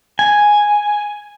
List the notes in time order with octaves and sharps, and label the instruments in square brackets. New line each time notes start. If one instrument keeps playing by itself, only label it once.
[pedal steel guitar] G#5